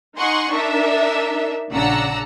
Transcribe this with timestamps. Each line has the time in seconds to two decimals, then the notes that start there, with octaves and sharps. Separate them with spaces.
0.18 D#4 F#5 G#5 C6 C#6
0.51 D4 D#4 A#4 E5
1.72 A#1 C#3 D4 F#5 A#5 E6